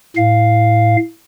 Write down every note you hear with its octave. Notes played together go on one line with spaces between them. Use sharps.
A2 F5